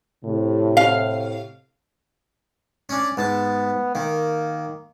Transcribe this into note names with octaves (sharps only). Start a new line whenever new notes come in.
A2 C3
F5
C#4 D4
G#2 B3 A5
D#3 A#3